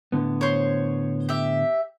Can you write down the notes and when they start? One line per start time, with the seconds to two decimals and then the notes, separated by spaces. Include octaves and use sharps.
0.12 A2 D3 B3
0.41 C5 C#5
1.29 G4 E5